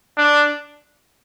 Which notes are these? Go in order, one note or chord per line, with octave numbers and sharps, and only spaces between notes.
D4